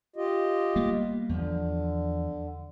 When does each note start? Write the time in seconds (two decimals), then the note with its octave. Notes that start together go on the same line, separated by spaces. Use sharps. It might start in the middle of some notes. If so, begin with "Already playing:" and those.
0.16 F4 G4 D#5
0.76 G3 A#3 B3
1.29 E2 D3 F3